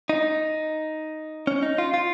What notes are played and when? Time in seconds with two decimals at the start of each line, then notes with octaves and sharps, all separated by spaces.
0.09 D#4
1.47 C#4
1.63 D#4
1.78 F4
1.94 F4